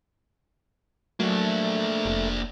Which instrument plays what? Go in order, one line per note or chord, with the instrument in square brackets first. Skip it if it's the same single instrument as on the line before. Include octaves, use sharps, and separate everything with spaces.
[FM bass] F#3 [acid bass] A3 [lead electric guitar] A#3 D4
[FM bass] F1